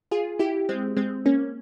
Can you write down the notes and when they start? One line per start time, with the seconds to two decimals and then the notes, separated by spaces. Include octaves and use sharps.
0.11 F4 G#4
0.39 E4 G4
0.69 G#3 C4
0.97 G#3 C4
1.25 A#3 C#4